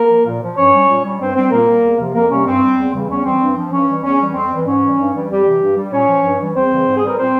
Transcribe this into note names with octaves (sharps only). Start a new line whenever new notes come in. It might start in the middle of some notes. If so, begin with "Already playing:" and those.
Already playing: A#3 A#4
F3
A#2
F3
G2 C#4 C#5
G3
A#2
G3
G2 C4 C5
G3 C4 C5
A#2 A#3 A#4
G3
E2
C3 F3
F2 A#3 A#4
C3 G3 C#4
G2 C4
G3
E2
C#3 E3 G3
E2 C#4
E3 G3 C4
G2
F3
G2 C#4
E3 G3
E2 C#4
E3 G3
F2 C4
E3 G3
G#2 C#4
E3 G3
G2
E3 G3
F2 G3 G4
C3 E3 G3
G2
G3
A#2 C#4 C#5
F3
G2
E3 G3
E2 C4 C5
C#3 E3 G3
G#2
G#4
E3 G3 A#4
A#2 C4 C5